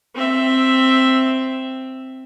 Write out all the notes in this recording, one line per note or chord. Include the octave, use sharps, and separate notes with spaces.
C4 E5